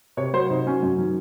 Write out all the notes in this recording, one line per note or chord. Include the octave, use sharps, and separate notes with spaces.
C3 C#5
F#3 C5
C3 D#4
F#3 C#4
F#2
D#3 F#3